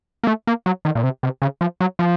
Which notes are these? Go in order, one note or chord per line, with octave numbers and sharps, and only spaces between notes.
A#3
A3
A#3
F#3
D#3
A#2
C3
C3
C#3
F3
F#3
F3